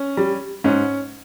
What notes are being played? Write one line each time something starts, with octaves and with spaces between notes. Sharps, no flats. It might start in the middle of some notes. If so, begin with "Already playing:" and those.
Already playing: C#4
G3
G#2 C#4